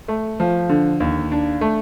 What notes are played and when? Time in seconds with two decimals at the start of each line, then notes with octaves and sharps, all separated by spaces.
0.08 A3
0.40 F3
0.69 D3
1.00 D#2
1.32 D4
1.61 A3